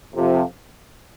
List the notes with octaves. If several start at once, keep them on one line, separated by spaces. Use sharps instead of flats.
F2 C3 F3